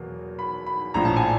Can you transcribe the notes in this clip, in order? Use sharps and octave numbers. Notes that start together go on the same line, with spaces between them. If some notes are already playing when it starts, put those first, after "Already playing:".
Already playing: E2 B2 F#3 A#3
B5
B5
A#1 A2 F3 A#5
A5
G#5